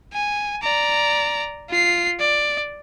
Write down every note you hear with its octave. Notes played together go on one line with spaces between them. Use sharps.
G#5
D5 A#5
F4 C7
D5